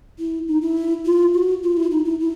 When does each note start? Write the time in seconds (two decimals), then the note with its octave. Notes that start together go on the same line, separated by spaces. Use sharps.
0.19 E4
0.48 D#4
0.62 E4
1.06 F4
1.34 F#4
1.63 F4
1.77 E4
1.91 D#4
2.05 E4
2.20 E4